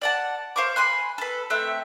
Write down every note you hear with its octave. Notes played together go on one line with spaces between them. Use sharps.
D5 F#5 A5
C5 F5 C#6 D6
G#5 B5 C6 F#6
A4 B4
A3 C4 E5 F#6